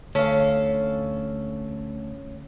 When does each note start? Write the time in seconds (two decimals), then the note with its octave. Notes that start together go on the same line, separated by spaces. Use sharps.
0.15 D2 C#4 A4 F5